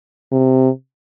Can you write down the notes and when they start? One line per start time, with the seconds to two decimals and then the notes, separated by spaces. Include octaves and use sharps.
0.32 C3